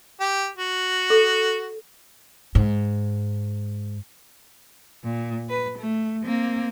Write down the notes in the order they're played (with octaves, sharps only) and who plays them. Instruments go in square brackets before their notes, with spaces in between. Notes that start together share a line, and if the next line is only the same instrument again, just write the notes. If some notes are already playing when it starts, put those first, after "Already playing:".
[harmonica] G4
F#4
[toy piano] A4
[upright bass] G#2
[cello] A#2
B4
A3
A#3 C4